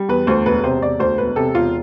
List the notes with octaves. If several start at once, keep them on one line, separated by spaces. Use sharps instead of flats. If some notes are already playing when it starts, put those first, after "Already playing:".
Already playing: G3
E2 B4
D2 C5
E1 B4
C3 C5
E1 D5
D2 C5
E1 B4
C3 A4
E1 F4